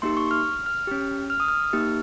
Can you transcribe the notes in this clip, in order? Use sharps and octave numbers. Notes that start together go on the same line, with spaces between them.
A#3 D#4 G4 C6
C#6
F6
F6
C#4 G4
F6
D#6
F6
A#3 D#4 G4